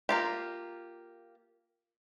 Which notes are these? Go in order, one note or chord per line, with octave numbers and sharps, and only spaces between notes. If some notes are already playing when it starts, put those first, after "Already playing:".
A#3 F4 G4